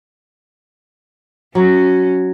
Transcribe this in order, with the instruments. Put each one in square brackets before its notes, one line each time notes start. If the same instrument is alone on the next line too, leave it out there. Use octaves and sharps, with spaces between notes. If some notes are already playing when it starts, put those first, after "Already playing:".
[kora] F#3 [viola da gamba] C#4